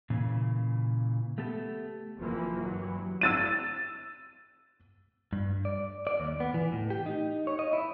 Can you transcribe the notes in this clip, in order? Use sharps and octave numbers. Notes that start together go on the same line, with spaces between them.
A#2 C#3 E3
A3 B3 G4 A4
F#1 F2 E3 F3 A#3
G2 E3 F#3
E6 A6 D#7
G2
D5
D5
D#2
B3
E3
A2
G4
D#4
C#5
D#5
E4